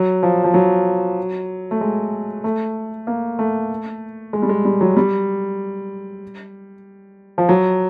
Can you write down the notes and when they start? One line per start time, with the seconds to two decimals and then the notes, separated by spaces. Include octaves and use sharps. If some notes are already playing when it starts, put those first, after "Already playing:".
Already playing: F#3
0.23 F3
0.44 F3
0.54 F#3
1.71 A3
1.81 G#3
2.44 A3
3.07 A#3
3.39 A3
4.33 G#3
4.42 G3
4.49 G#3
4.65 G3
4.81 F#3
4.97 G3
7.38 F3
7.49 F#3